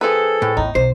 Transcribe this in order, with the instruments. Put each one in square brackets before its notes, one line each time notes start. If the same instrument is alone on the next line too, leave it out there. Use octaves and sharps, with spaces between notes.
[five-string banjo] F3 C4 B4 [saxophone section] G#4 A4
[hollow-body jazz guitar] A2
[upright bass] A1 E2 [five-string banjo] D#4
[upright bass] B1 [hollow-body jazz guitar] C5